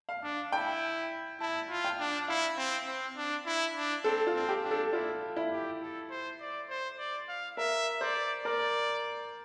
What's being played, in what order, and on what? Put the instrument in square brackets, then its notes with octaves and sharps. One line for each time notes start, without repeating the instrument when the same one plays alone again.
[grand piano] F5
[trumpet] D4
[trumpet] E4 [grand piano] G5
[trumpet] E4 [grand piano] A5
[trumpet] F4
[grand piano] G5
[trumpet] D4
[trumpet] E4 [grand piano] F5
[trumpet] C4
C4
D4
E4
D4
[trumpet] C4 [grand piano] A4
[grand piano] F4
[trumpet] C4
[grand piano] G4
[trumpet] D4
[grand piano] A4
[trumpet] E4 [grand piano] F4
[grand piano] E4
[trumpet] G4
A4
C5
D5
C5
D5
F5
[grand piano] A#4 [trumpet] E5
[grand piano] C5 [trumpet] D5
[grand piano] A#4 [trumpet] D5